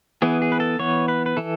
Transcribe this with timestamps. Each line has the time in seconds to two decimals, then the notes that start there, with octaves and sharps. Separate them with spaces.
0.22 E3 B3 G#4
0.42 G#4
0.52 B4
0.60 A4
0.79 E3 B3 C#5
1.08 B4
1.26 B4
1.37 E3 A4